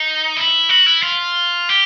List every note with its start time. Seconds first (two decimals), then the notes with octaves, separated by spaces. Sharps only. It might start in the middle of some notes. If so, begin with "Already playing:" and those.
Already playing: D#4
0.37 E4
0.69 F#4
0.86 E4
1.03 F4
1.69 G4